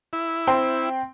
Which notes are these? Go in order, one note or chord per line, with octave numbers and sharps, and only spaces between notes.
E4
C4 G5 C6